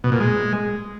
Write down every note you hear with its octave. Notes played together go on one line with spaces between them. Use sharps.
B2
A#2
G#3